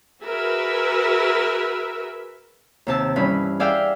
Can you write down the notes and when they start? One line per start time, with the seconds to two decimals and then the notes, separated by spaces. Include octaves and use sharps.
0.24 F#4 G#4 A#4 B4 E5
2.87 D#2 C3 A5 E6
3.16 G2 E3 C#4 B5
3.60 G#4 D5 E5 F5 G5